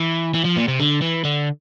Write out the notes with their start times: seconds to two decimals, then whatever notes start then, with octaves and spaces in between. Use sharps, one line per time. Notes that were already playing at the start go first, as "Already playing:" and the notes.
Already playing: E3
0.34 E3
0.45 F3
0.57 A#2
0.68 C3
0.80 D3
1.01 E3
1.24 D3